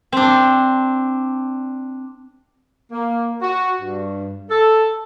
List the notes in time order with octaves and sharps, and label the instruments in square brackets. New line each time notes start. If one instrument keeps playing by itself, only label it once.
[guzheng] C4 D4
[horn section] A#3
F#4
G2
A4